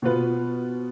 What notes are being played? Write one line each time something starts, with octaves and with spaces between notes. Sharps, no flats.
B2 B3 F4 B4